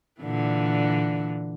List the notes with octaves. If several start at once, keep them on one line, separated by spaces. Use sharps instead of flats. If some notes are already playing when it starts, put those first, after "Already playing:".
A#2 D3 E3